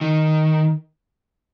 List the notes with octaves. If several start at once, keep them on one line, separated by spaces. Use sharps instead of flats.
D#3